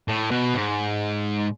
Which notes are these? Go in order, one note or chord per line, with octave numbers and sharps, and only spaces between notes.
A2
B2
G#2